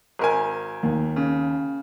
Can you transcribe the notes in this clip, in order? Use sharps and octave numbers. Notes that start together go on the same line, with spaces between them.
G#1 A#4 G#5
D#2
C#3